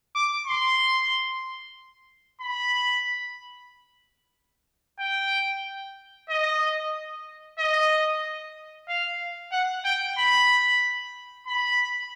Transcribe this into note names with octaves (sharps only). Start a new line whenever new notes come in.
D6
C6
B5
G5
D#5
D#5
F5
F#5
G5
B5
B5